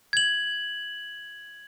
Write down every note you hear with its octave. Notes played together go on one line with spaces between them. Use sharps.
G#6 F#7